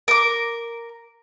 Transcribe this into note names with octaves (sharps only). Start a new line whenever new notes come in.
A#4 D6